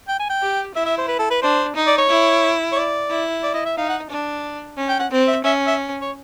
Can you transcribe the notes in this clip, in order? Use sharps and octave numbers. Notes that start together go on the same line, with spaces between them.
G5
G#5
G5
G4
E4 E5
E5
C5
B4
A4
B4
D4 C5
D#4
D5
C#5
E4
C#5
D5
E4
D5
D#5
E5
D#4 F5
F#5
D4
C#4
G5
F#5
C4
E5
C#4 E5
E5
C#5